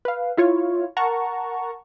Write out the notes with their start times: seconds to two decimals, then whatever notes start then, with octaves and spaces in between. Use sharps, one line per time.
0.05 B4 F5
0.37 E4 F4 C#5
0.97 A#4 F#5 A5 A#5 C#6